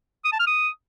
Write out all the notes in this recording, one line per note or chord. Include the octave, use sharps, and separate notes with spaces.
D#6
A5
F6
D#6